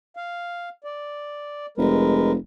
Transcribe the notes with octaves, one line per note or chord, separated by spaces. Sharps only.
F5
D5
F1 G#3 A#4 B4